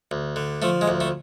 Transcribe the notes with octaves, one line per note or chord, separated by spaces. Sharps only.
D2
D3
F3 A3
G#3
D2
A3